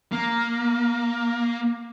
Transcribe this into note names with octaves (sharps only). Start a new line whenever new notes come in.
A#3